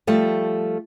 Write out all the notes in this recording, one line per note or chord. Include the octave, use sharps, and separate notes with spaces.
F3 G3 A3